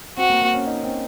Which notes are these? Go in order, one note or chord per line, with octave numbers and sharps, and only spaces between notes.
C4 F#4
A#3
A#3
C#4
D#4
C4